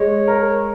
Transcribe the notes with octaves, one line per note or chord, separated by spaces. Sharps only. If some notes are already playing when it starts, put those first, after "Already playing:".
Already playing: G#3 C#5
A#4